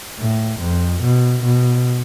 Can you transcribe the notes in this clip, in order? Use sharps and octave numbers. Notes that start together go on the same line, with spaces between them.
A2
F2
B2
B2